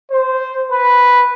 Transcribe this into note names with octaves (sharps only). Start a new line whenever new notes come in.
C5
B4